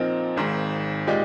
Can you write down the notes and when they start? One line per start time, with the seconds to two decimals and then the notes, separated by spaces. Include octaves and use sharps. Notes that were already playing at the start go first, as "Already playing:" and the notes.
Already playing: A#2 F3 C4 D#4 A#4
0.37 G#1 G#2 D#3
1.07 A#2 G#3 D#4 G4 D5